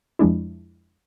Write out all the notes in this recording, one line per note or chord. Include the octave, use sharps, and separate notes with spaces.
F2 F3 G#3 D4 E4